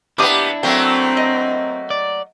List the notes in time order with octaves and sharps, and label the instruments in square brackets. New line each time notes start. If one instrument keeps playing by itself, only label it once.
[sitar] A#3 B3 [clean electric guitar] D4 E4 [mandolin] G4 D6 D#6
[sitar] F#3 A3 A#3 [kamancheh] C4 [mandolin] G5
[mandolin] D#5
[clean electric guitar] D5